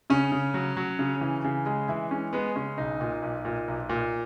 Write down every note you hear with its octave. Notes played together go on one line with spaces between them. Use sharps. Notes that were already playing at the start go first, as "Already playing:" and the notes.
C#3 C#4
C#3
F#3
F#3
C#3
E3
C#3
G#3
E3 E4
G#3 C#4
G#3 B3
C#3 C#4
B1 D#4
A#2
B1
A#2
B1
A#2